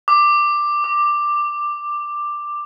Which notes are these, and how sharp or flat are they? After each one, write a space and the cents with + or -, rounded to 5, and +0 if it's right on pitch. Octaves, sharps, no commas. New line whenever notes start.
D6 +10
D6 +15